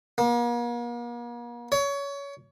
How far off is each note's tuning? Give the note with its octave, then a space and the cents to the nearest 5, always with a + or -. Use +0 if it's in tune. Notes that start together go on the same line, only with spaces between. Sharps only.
A#3 +40
C#5 +25